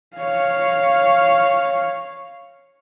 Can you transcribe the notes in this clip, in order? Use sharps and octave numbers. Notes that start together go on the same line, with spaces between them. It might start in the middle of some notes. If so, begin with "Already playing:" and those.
C#5 F5